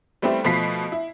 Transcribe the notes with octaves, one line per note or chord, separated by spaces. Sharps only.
G3 A3 B3 C4 E4 G4
B2 F3 A3 B5 B6 C7
E4